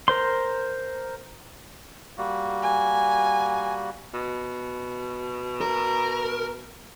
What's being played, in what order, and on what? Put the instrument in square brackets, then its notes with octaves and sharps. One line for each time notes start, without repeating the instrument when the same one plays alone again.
[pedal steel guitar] A#4 C5 C6
[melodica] G3 A#3 F#4
[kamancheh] G#5
[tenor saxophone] B2
[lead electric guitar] A#4